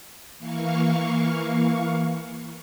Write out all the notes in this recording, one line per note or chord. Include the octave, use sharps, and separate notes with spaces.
E3 A#3 F5 C#6